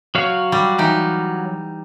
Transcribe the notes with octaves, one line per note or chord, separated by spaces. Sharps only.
F#3 C#5 F5
G3
E3 D#4 G4